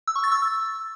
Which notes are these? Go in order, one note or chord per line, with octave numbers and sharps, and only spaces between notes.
E6
C#6
A6
E6